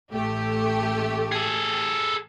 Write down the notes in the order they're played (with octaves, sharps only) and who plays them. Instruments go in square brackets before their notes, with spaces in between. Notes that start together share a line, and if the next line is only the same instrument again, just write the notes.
[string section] A1 A3 G4
[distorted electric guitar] G#4 A4